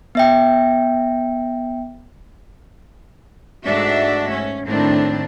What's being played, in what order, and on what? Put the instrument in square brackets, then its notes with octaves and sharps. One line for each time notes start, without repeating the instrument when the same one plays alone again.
[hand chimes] B3 E5 G5
[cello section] G#2 A3 D4 F#4 E5
C#4
A2 D#3 C4 D4